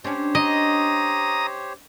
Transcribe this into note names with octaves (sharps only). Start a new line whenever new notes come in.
C#4 D4 G4 C5 C#5
D#5 A#5 D#6